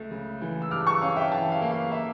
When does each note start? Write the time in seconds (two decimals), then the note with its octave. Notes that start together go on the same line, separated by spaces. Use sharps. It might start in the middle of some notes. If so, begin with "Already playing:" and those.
Already playing: C#2 A3
0.11 C#3
0.41 E3
0.62 E6
0.71 G2 D6 F6
0.87 C#6 E6
1.01 C#4 F5
1.16 E5 G5
1.32 E3 F5 A5
1.51 F5
1.62 A#3
1.71 F5
1.92 E5